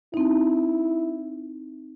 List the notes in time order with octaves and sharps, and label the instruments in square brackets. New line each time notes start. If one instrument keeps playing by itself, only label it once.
[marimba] C4 D#4 [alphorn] E4